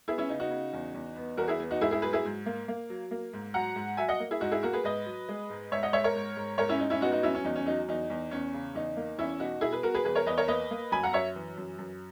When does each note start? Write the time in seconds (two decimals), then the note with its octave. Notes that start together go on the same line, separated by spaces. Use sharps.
0.08 B3 E4 G#4
0.18 C#4 E4
0.29 C#3 D#4
0.40 D#4 F#4
0.50 C#3
0.73 E2
0.94 E2
1.16 B3
1.37 E2 F#4 A#4
1.48 E4 G#4
1.60 B3
1.71 D#4 F#4
1.81 G#2 E4 G#4
1.91 E4 G#4
2.02 F#3 G#4 B4
2.13 E4 G#4
2.25 G#2
2.46 A#3
2.68 A#3
2.90 F#3
3.11 A#3
3.33 G#2
3.54 F#3 F#5 A#5
3.76 G#2
3.97 F#3 E5 G#5
4.08 D#5 F#5
4.20 A#3
4.31 E4 G#4
4.41 G#2 D#4 F#4
4.51 E4 G#4
4.63 A#3 F#4 A#4
4.73 G#4 B4
4.84 G#2 B4 D#5
5.06 F#3
5.29 G#3
5.50 G#2
5.71 G#2 C#5 E5
5.83 D#5 F#5
5.92 G#3 C#5 E5
6.04 A#4 C#5
6.15 G#2
6.36 G#2
6.58 G#2 A#4 C#5
6.69 C#4 E4
6.79 G#2 D#4
6.90 C#4 E4
7.01 B3 D#4 F#4
7.12 D#4 F#4
7.23 F#3 C#4 E4
7.35 C#4
7.44 E2 D#4
7.56 C#4
7.66 F#3 D#4
7.88 E2 D#4
8.10 E2
8.31 E2 C#4
8.54 C#3
8.74 E2 D#4
8.97 A#3
9.18 E2 C#4 E4
9.40 B2 D#4 F#4
9.61 B2 E4 G#4
9.73 G#4 B4
9.83 B2 F#4 A#4
9.94 G#4 B4
10.05 E2 G#4 B4
10.15 A#4 C#5
10.26 E2 B4 D#5
10.38 A#4 C#5
10.48 A#3 B4 D#5
10.71 A#3
10.91 F#2 G#5 B5
11.03 F#5 A#5
11.13 F#2 C#5 E5
11.36 E3
11.58 F#2
11.79 F#2